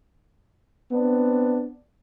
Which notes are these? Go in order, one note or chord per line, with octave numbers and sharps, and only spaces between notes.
B3 C4 D4